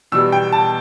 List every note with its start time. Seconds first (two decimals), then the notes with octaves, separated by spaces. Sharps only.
0.12 E2 B2 G3 E6
0.32 G5
0.52 A5